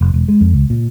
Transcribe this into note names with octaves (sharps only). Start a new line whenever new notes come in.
F1
E1
G#3
F2
C#2
A#2